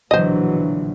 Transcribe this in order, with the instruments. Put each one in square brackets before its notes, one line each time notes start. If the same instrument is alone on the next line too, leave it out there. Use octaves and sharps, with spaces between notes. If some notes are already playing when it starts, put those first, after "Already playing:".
[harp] A#1 D3 [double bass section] B2 E3 F#3 [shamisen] C5 D#5